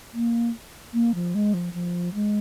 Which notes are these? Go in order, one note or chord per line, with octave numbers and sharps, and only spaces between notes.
A#3
A#3
F3
G#3
F3
F3
G#3